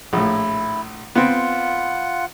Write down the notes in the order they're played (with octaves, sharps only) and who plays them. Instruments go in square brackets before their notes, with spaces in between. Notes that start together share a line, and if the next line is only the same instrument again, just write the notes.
[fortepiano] A#1 A2 [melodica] E4
[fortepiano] B3 C4 [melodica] F4 F#5